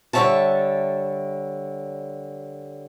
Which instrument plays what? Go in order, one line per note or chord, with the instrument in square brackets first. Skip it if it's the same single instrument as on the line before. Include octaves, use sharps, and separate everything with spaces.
[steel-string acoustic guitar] D3 G3 C#5 E5 A5